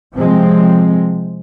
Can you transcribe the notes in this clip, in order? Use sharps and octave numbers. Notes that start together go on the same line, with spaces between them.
C3 F3 G#3 C4